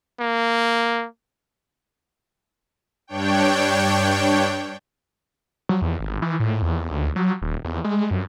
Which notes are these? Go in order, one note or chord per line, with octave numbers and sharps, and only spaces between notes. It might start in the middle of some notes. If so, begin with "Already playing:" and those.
A#3
G2 D4 C#5 G5
F#3
E2
G#1
E3
A2
E2
D2
F#3
D#1
E2
G#3
F#2